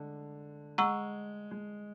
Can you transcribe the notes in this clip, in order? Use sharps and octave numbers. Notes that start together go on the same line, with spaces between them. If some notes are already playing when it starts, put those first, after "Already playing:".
Already playing: D3 G#3
G#3 F#5 A#5 C#6 E6
G#3